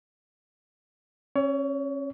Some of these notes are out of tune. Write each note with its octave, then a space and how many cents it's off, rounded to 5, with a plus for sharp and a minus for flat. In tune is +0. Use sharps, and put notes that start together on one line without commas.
C#4 -30 C#5 +30